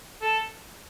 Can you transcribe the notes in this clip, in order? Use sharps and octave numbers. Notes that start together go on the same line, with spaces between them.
A4